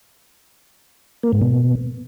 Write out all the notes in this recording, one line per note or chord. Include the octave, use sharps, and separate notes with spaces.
A#3
G#2
B2